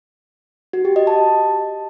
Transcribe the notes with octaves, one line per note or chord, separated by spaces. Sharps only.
F#4
G4
D#5
A5